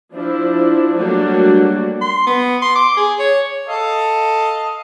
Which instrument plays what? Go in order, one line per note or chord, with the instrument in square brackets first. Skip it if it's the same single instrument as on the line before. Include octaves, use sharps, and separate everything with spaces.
[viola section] F3 D4 E4
F#3 G3 A3 A#3 D4 F#4
[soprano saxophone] C6
B3
C6
D6
G#4
C#5
[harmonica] A4 D#5 F5